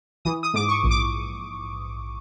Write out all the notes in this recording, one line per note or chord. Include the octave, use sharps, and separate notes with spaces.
E3 D#6
D#6
G#2 D6
C#6
A#1
D6